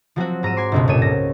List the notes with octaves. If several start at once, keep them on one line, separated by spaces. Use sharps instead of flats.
F3 F#3 C4 F#4
G#2 A#5 E6 D#7 E7
G#5 C6 D6
G1 C#2 B2
A#2 A4 C#5 D#7 E7
G#2 A#6